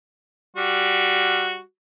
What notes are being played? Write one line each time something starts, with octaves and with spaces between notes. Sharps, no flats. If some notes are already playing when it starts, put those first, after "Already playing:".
G3 F#4